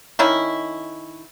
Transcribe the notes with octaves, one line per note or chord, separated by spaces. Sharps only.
D#3 C#4 E4